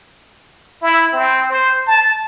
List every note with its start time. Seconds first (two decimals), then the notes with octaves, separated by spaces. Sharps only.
0.82 E4
1.13 C4
1.50 C5
1.87 A5